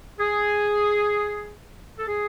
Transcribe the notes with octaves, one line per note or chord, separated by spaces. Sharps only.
G#4
A4
G#4